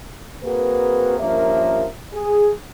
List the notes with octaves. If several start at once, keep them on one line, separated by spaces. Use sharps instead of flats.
A#3 C4 F#4 G#4 A#4 B4
G2 F3 A#3 C#4 A#4 E5
G#4